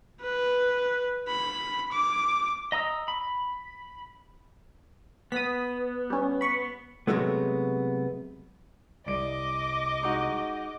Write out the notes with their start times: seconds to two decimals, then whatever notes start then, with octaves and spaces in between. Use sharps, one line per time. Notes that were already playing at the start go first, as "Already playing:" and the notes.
0.22 B4
1.28 B5
1.92 D6
2.72 D#5 A#5 D#6 E6
3.08 B5
5.32 B3 D#6 B6
6.10 G3 C#4
6.41 B5 C#6
7.07 C3 F#3 G#3 A3 B3
9.06 C2 D5 D#5 D6 D7
10.02 G#3 D#4 F#4